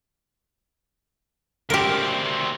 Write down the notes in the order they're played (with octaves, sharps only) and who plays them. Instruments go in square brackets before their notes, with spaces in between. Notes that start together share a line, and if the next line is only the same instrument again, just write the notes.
[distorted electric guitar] D2 C4 [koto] G4 A#4